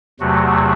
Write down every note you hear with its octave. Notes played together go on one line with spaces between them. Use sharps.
E2 C3 F#3 A3 F#4